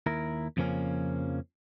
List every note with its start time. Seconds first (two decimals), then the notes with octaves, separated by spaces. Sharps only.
0.06 D#2 E4 A#4
0.57 F2 C#3 F3 A#3 C#4